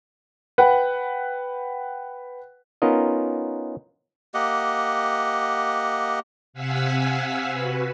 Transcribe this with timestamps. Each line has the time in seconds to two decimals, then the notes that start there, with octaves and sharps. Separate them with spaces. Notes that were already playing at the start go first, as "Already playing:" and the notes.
0.58 B4 F#5 G5
2.82 B3 C#4 D#4 F4 A#4 D#5
4.34 A#3 G4 D#5 F#5
6.53 C3 F5 F#5 G#5 E6 B6
7.52 F#4 B4